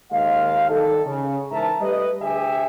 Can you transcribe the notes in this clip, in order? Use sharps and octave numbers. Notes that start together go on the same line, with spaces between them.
D#2 D#3 G#3 F5
D#3 G3 D#4 A4
C#3
G#2 E3 A#4 E5 A5 A#5
G3 A3 B4 D#5
D2 G4 G#4 E5 G#5